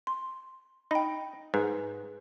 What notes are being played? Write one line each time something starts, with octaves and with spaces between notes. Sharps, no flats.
C6
D#4 G5 B5
G#2 B4